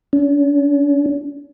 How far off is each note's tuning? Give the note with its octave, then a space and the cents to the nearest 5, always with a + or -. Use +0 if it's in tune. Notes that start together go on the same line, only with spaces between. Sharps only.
C#4 +45